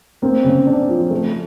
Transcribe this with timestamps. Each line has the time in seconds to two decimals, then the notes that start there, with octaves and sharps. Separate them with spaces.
0.22 A#3 C4
0.44 C#3
0.66 D4
0.89 F3
1.11 A3